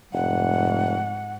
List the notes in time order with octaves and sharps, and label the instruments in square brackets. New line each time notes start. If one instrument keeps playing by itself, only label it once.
[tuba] F1 [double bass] G#2 [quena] F#5